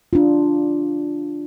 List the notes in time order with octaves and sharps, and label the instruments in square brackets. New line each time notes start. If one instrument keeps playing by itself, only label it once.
[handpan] D4 F4